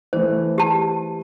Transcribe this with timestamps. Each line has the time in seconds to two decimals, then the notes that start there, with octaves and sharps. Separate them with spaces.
0.13 E3 A3 C5
0.58 G4 A5